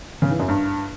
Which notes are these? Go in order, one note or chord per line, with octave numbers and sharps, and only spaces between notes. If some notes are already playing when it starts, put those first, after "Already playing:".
C#3
E3
F#2
G2